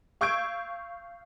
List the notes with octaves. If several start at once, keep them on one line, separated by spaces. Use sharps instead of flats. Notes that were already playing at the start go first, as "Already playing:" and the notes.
F5 C#6 E6 G6 G#6 D7